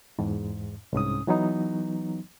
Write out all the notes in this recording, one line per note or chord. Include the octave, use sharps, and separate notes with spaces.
E2 G#2
C2 G#2 C#4 D#6
E3 F#3 B3 D#4